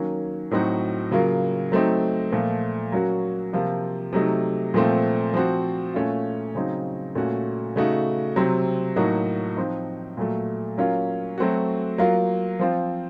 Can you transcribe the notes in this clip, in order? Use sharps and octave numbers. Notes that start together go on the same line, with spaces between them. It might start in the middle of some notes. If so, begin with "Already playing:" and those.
Already playing: D#3 F#3 A#3 C#4
A2 F#3 C4 D#4 F#4
C#3 F#3 A#3 F4
F#3 A3 C4 D#4
A#2 F3 A3
F#3 A#3 C#4 F#4
C3 F3 A#3 F4
C3 F#3 A3 D#4
A#2 F3 A3 C4
F3 C4 F#4
A#2 A3 C#4 F4
C#3 F#3 C4 D#4
A#2 A3 C#4 F#4
C#3 A3 D#4 F#4
C3 F#3 C4
A2 F#3 A#3 D#4 F#4
F3 C4 D#4
A#2 F#3 A3
F#3 A#3 C#4 F4
F#3 A3 C4 F#4
F#3 A#3 F4
F3 C4 F4